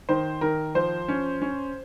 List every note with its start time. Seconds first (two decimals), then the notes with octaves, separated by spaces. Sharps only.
0.09 D#3 C5
0.41 D#3 A#4
0.75 F3 C5
1.08 C#4
1.42 C#4